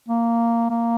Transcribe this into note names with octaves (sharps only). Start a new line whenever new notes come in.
A#3
A#3